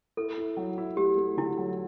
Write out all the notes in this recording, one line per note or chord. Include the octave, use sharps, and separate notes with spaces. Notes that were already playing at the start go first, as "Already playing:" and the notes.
E4 A4
E4
F#3
E4
A3 G4
A3
D3 E4
F#3